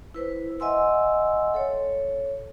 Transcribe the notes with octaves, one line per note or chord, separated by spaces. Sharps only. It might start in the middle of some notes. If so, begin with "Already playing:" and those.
E4 B4 C5
D#5 E5 F#5 G#5 C6 E6
A4 C#5